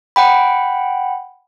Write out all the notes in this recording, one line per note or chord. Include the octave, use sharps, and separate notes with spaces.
F#5 G5 B5